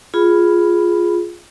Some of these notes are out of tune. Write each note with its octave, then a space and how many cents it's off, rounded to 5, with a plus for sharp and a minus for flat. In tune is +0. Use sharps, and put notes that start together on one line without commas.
F4 +0 G#4 +0 B5 +0